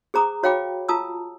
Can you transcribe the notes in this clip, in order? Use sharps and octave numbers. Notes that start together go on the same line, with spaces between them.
G#4 C5 A#5 D6 D#6
F#4 C#5 F5 G5 B5 D6
F4 A5 A#5 D#6 E6